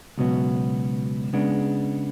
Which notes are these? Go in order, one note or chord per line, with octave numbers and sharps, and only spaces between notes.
C#2 B2 F#3 B3
C#3 G#3 B3 D4